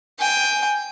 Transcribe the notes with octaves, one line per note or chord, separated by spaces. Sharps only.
G5 G#5